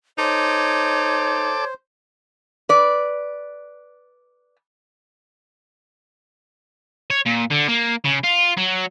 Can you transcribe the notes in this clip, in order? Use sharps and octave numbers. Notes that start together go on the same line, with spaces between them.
D#4 A4 C5 C#5 D6
B4 D5
C#5
A#2
D3
A#3
C#3
F4
F#3